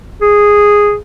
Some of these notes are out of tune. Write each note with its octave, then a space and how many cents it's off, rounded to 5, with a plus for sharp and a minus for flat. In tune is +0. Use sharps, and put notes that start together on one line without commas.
G#4 -5